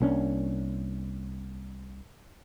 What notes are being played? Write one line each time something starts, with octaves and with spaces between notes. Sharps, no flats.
C2 A#3 C#4 D4